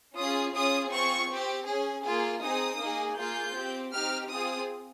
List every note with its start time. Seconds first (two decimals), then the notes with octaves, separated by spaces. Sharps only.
0.17 C#4 F4 G#4 D#6
0.54 C#4 F4 G#4 D#6
0.92 C4 F4 G#4 C#6
1.31 C4 G4
1.68 C#4 G#4
2.05 A#3 F4 G#4
2.43 C4 D#4 G#4 D#6
2.81 A#3 D#4 G#4
3.18 A#3 F4 G#4 G6
3.56 C4 G4
3.93 C4 D#4 G4 F6
4.31 C4 F4 G#4 D#6